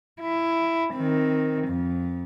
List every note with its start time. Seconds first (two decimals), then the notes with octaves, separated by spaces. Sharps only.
0.21 E4
0.94 D#3 C4
1.67 F2